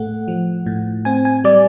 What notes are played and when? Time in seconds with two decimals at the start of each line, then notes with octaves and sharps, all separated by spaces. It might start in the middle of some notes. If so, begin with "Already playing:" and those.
Already playing: A2 A3 F#5
0.28 F3
0.66 A2
1.05 C4 G#5
1.25 G#5
1.44 G3 D5